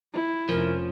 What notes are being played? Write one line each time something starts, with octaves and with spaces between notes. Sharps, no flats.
E4
F1 F3 A3 C#4 A#4